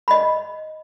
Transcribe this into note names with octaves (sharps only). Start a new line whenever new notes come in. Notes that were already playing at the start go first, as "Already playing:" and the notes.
D#5 B5